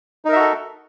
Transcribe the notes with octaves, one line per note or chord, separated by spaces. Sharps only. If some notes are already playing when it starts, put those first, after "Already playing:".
D#4 F#4 A4 A#4 E5